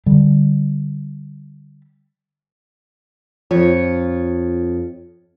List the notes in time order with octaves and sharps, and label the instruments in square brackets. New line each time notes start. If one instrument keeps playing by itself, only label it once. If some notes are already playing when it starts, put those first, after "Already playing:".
[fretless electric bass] D3 G3
[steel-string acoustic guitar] F2 F4 C#5